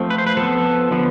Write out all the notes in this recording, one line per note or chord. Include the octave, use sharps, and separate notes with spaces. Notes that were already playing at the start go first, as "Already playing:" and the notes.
Already playing: F3 A3 C4
B4
C5
B4
F3 B3 A4
D3 F3 B3